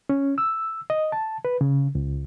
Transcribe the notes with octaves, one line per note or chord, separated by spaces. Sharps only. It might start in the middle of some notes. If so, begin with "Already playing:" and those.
C#4
E6
D#5
A5
B4
C#3
C#2